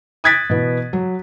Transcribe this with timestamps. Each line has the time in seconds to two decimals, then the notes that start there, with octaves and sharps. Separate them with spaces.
0.24 D#6 F#6 G#6 A6 B6 D7
0.50 B2 E3 B3
0.93 F#3